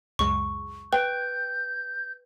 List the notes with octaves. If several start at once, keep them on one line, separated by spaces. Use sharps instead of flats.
C#2 F#2 G#3 C#6
B4 G5 G6